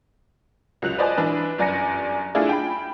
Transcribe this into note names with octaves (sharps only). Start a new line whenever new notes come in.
C#2 F#3 F#6 F7
B4 C5 D5 D#5 G#5 A5
E3 D4 B4
G1 F#2 D5 G#5 A#6 C#7
A3 D4 E4 F4 G#4 D5
G5 B5